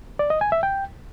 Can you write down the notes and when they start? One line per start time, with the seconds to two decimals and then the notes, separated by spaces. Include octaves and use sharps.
0.19 D5
0.30 D#5
0.41 G#5
0.52 E5
0.63 G5